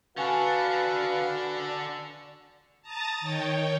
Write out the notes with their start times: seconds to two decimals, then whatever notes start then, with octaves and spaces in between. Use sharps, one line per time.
0.17 D3 D4 F#4 B4 F5 F#5 G#5 C#6
2.82 A5 A#5 D#6 A6
3.20 D#3 C#5 G5